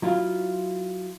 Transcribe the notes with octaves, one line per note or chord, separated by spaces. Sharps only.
F#3 E4 F4